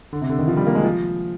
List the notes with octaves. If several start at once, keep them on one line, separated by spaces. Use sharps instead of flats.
D3
C3
D3
D#3
F3
G3
A#3
G#3
F3